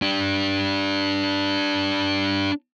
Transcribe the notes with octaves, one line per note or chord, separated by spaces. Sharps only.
D4 G4